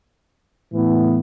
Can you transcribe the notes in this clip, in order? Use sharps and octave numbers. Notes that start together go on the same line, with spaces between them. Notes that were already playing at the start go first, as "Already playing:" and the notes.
A2 E3 B3